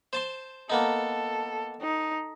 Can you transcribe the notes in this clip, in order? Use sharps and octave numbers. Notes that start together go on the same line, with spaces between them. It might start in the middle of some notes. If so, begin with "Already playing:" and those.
C5 A5 C6
A#3 B3 D#4 A4
D#4